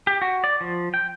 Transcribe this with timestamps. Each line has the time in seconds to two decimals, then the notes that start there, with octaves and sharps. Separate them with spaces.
0.07 G4
0.22 F#4
0.44 D5
0.61 F3
0.94 G5